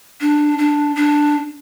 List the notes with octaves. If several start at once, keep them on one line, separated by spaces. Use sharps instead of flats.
D4
D4
D4